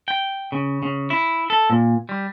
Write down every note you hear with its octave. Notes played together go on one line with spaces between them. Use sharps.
G5
C#3
C#3
E4
A4
A#2
G3